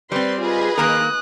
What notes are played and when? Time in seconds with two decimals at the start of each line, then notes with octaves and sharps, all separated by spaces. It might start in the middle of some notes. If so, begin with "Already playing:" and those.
0.12 G3 C4 B4 D5 C6
0.41 F4 G#4 B4 D#5
0.78 D#3 A#3 A#4 D#6 F#6